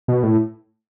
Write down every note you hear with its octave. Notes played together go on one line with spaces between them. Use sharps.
B2
A2